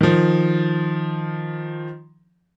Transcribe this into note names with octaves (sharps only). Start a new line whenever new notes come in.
D#3 F3